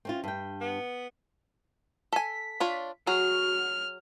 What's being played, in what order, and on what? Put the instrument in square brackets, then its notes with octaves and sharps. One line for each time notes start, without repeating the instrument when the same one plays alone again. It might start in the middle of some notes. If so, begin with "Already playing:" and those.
[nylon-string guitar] C4 C#4 F4
G2 G5
[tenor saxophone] B3
[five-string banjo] A4 G#5 [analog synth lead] B6
[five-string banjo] D4 F4 C#5
[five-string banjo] F#3 G#4 [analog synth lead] F#4 [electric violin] F6